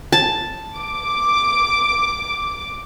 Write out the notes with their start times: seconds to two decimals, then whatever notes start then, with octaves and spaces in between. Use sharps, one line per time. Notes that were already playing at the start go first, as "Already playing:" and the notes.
0.12 A5
0.77 D6